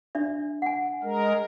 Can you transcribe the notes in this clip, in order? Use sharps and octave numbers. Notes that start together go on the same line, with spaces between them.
D4 D5 E5
F#5 G#5
G#3 A#4